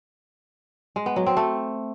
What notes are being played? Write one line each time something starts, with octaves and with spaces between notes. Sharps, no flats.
G#3
B3
F#3
C4
A3